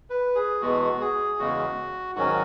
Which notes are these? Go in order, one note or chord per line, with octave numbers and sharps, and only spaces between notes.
B4
G#4
E2 B2 G#3 B3 F#4
G#4
E2 C#3 G#3 F#4
G#2 D#3 F#3 C#4 F#4